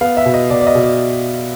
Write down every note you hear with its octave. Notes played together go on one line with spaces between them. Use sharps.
B3 F5
E5
B2
D#5
B2 D5
D5
D#5
B2
D5